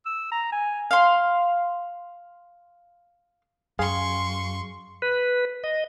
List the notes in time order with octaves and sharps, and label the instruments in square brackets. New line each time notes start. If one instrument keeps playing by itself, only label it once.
[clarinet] E6
A#5
G#5
[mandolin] F5 C6
[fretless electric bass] F#2 [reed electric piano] G#4 F5 [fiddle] C6 C#6
[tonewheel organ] B4
D#5